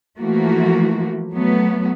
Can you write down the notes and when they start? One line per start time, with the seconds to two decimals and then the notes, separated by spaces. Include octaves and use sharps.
0.19 E3 F3 A3 A#3 F#4
1.31 F#3 A3 B3